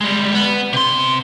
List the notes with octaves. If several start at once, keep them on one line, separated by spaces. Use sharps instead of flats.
G3 G#3
B3
C3 C6